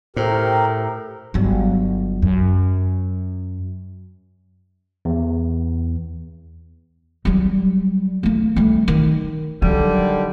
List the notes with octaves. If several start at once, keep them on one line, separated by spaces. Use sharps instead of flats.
A2 G4 A#4 C5
G1 F#3
F#2
E2
F#3 G3
A3 A#3
G3 A3
D#3
D3 D#3 F#3 G3